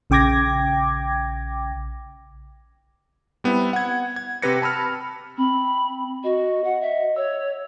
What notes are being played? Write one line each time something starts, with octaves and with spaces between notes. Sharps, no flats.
A#1 C#3 G5 D6 G#6 A#6
G3 B3 C4 E4
F#5 G#6
G#6
C3 C4 G4 B4 A#6 C#7
A5 B5 E6 F6
C4 B5
F#4 D#5
F#5
E5
C#5 E6